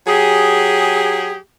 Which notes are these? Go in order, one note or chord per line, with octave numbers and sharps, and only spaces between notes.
F#3 G4 G#4